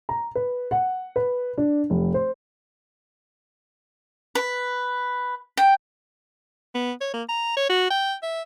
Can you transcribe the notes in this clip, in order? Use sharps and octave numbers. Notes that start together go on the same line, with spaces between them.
A#5
B4
F#5
B4
D4
F1
C5
B4
G5
B3
C#5
A#3
A#5
C#5
F#4
G5
E5